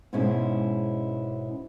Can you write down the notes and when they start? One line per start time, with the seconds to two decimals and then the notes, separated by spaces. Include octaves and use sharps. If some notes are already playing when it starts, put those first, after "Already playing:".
0.13 G#2 B2 G#3 C#4 E4